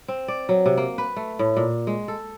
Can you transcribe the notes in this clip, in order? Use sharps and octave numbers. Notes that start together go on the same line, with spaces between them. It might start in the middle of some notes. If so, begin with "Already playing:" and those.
C4
D5
F#3
C3
A#3
B4
A3
A2
A#2
G#3
A4